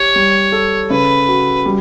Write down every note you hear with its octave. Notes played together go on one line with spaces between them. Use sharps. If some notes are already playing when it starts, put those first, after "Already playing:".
Already playing: G4 C#5
G3
A4
C#3 B4
F#4
G3